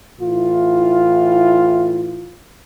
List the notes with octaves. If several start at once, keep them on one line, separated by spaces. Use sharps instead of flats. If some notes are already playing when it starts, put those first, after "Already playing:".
A2 E3 F4